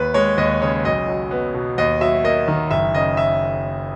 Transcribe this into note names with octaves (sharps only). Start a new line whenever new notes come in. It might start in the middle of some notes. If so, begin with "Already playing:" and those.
Already playing: D#2 B4
G#3 C#5
D#2 D#5
C#3 C#5
B1 D#5
F#3
B3
B2
D#2 D#5
F#3 E5
A#3 D#5
D#3
F#1 E5
C#3 D#5
E5